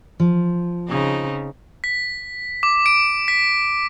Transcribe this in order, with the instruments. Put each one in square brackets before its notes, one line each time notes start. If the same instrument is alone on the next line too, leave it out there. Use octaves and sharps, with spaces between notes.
[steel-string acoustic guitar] F3
[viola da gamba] C#3 C4 D#4
[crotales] B6
D6
D7
B6